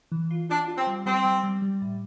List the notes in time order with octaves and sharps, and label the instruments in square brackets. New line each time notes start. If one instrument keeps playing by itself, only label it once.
[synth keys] E3
F4
[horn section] D4 [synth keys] F4
[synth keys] F4
[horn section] C4
[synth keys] G3
[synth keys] G3 [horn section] C4
[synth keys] G3
G3
G3
A2